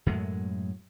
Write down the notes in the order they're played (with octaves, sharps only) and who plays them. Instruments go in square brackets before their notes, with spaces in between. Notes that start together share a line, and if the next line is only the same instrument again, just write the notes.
[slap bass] F#2 A2 F#3 G#3